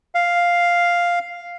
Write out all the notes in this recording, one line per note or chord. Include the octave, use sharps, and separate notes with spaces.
F5